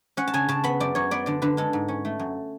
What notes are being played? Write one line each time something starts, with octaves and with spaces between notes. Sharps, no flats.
C#4 F#5
A5
C#3 G#5
C#3 A5
B3 B5
F#2 D5
F#2 C#5
B3 D5
D3 D5
D3 B4
G#3 A4
G#2
C#4
A3
F#2